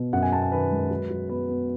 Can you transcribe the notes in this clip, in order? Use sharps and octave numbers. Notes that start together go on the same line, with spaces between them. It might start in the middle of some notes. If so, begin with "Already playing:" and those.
Already playing: B2
F#2 F#5
G#5
B3 A5
G#5
D#3 B4
G#3
F#3
F#3
B3 B4
B3